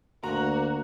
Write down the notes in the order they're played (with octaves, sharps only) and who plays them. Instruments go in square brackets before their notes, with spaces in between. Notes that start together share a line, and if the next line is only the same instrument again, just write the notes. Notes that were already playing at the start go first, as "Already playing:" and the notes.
[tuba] D2 [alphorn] A#3 [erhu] F#4 [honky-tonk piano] A#5